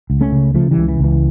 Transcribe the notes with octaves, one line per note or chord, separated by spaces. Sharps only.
C#2
A3 C#4
C#3
C#3 F3 A3
E3 G3
C#2
E3
C#2 E3